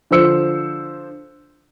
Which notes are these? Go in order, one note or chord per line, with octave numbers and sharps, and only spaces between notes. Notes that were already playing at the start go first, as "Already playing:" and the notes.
D3 F3 C5 E6 C#7